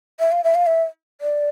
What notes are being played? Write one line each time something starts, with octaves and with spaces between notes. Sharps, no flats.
E5
F5
E5
F5
E5
D5